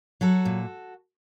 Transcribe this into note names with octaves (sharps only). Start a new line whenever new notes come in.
F#3 F#4 A4
A#2